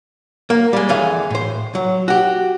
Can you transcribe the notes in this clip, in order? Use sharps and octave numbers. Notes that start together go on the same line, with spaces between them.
A#3
G3 G#3
F2 D3 E3 G#4 F5
A2 C5
F#3
F#4 G4